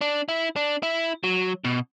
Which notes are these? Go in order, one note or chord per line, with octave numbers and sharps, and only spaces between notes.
D4
E4
D4
E4
F#3
B2